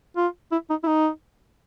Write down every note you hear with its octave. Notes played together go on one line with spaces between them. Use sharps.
F4
E4
D#4
E4
D#4